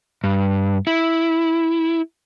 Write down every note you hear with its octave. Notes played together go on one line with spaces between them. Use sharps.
G2
E4